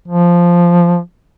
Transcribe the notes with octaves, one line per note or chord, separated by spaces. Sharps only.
F3